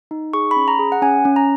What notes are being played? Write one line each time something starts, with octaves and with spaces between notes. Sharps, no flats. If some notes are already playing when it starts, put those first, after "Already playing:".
D#4
G#4 C#6
B5
C#4
A#5
G#4
F#5
C#4 G#5
C#4
A#5